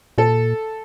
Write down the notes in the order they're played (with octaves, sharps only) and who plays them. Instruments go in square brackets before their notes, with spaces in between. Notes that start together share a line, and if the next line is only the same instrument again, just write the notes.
[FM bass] A#2 [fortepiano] A4